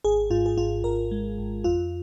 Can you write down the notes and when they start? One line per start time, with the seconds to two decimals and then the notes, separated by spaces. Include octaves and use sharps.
0.04 G#1 G#4
0.30 G#2 F4
0.46 G#4
0.57 G#1 F4
0.84 G#1 A#4
1.11 G#3
1.38 G#1
1.64 F2 F4